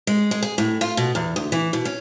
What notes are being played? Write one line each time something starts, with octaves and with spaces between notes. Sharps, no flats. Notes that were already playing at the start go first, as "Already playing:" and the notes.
G#3
G#3
G#4
A2
F4
B2
E2
D2
E3
B2
C#4